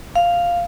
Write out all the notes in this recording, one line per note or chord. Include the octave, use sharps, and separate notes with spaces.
F5